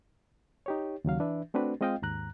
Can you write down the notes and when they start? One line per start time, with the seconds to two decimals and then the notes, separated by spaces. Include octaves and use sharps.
0.66 D#4 G4 C#5
1.05 D#2 C#3 F#3 F5
1.20 E3 D4 B4 E5
1.54 A3 C4 D4 F#4 B4
1.81 G#3 C4 F4 D#5 F5 G5
2.02 D#2 G#2 A#5 F#6